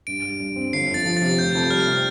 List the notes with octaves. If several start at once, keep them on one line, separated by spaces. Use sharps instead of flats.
G2 D7
G3
G2
C4
G1 C7
F2
A6
F3
A6
C3
F1 G6
F2
G3 F6
C3